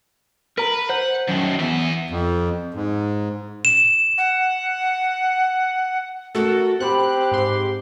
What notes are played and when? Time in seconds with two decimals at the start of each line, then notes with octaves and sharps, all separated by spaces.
0.58 A#4 B4 A#5
0.89 C5 F#5
1.28 F#2 A2 D#3
1.60 E2 B3 E5
2.10 F2
2.74 G#2
3.65 E7
4.18 F#5
6.35 A3 F#4 A4 A#4 E6
6.80 C4 G4 C5 B5 F#6
7.32 G#2 C6